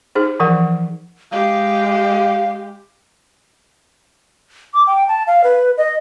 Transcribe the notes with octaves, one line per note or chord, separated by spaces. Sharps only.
D#4 G#4 C5
E3 F3 A#4 F#5
G#3 G4 F5
D6
G5
A5
F5
B4
D#5